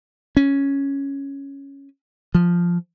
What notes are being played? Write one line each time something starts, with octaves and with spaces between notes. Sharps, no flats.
C#4
F3